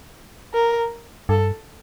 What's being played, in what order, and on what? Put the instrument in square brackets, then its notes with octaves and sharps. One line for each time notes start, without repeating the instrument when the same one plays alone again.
[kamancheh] A#4
[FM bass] G2 [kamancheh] A4